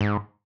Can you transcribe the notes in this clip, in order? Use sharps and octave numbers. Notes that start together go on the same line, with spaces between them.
G#2